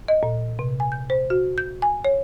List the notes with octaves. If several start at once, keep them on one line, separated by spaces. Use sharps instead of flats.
D#5
A#2
C3
G#5
G6
C5
F#4
G6
G#5
C#5